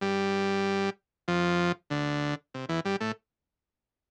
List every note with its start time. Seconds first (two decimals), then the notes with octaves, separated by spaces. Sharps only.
0.01 G2 G3
1.28 F2 F3
1.90 D2 D3
2.54 C3
2.69 E2 E3
2.85 G2 G3
3.00 A2 A3